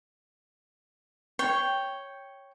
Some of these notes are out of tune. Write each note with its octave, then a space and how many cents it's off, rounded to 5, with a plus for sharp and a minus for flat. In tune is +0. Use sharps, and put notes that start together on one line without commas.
C#5 +0 G5 +0